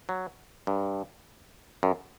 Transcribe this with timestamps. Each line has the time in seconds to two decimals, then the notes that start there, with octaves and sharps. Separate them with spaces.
0.09 F#3
0.67 G2
1.83 F#2